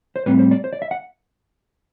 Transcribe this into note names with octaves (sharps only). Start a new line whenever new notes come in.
C5
A2 G3 C4 B4
C5
D5
C5
D5
E5
F#5